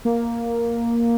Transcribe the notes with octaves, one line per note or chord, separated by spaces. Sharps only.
A#3